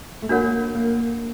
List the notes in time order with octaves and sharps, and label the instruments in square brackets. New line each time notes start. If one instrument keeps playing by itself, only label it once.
[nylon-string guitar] A3
[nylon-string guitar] A#3 [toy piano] D4 F#4 A#4 C#5 F#5
[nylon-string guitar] A#3